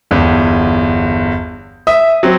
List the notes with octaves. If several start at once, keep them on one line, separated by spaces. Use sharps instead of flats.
G1 E2
E5 D#6
F#3 C4